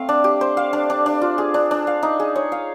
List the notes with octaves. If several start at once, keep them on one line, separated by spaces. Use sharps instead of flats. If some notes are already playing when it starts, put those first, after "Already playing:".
Already playing: A3 C4 F5
D4
G4
C5
F5
D4
D4
D4
F4
G#4
D4
D4
F5
D#4
G#4
C#5
F5